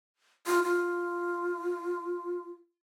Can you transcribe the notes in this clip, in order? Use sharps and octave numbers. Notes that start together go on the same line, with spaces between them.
F4
F4